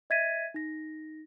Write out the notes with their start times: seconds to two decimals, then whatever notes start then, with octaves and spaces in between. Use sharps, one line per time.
0.10 D#5 E5 G#6 A6 B6 D#7
0.54 D#4 A#6